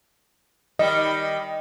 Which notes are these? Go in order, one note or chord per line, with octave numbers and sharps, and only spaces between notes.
D#3 G3 D#5